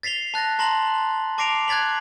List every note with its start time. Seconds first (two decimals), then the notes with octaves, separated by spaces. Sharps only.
0.03 A6 B6 C7 F7 G7
0.34 A5 F#6 A6 A#6
0.59 A5 A#5 C6 A#6 F#7
1.38 A5 D6 A#6 C7 D7 F7
1.68 F#6 G#6 A6 B6 F#7